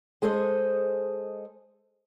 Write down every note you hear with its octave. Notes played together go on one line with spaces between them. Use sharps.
G#3 G#4 A4 C5 D#5